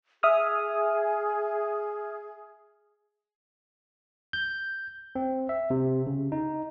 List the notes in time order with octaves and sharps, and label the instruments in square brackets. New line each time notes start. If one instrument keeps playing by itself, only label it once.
[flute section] G#4 [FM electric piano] E5 D#6 F6
[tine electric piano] G6
C4
E5
C3
C#3
D#4